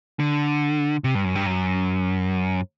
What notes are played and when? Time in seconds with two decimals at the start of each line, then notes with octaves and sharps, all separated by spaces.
0.20 D3
1.04 C3
1.15 G2
1.24 F#2
1.35 G2
1.46 F#2